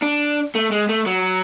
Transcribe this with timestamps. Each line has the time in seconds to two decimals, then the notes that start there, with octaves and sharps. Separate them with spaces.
0.02 D4
0.55 A3
0.71 G#3
0.89 A3
1.06 F#3